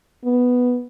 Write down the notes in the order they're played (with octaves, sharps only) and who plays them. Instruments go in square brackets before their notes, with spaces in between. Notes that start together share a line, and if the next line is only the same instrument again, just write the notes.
[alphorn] B3